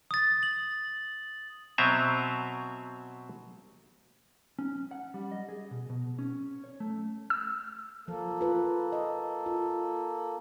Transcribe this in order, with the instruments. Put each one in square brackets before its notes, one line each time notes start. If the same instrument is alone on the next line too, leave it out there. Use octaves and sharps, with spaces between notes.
[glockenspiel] D#6 A6
F#7
[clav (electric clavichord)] B2 F#3 C4 E5 G#5 A#5
[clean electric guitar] C#4
F#5
G3
D#5
G#4
B2
B2
C#4
C#5
A3
[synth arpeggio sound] E6
[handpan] F3 [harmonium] A#3 A4
[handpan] F4 B4
D#5
F4